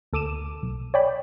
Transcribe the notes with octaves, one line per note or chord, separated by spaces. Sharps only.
D2 A4 D6 D#7 E7
B1
C#5 D5 G5 B5